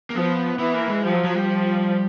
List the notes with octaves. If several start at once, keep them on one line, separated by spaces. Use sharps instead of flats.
A#3
F3 B3
E3 B3
A#3
G#3
F3 G3
F#3
F#3
G3
F3